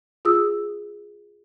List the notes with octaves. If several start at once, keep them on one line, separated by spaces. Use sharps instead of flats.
F4 G#4 D#6 E6